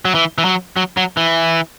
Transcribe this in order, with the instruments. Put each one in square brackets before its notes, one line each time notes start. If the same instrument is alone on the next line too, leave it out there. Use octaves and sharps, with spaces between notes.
[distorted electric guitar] F#3
E3
E3
F#3
F#3
F#3
E3